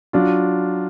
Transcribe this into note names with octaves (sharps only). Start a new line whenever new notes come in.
F#3 D4 F4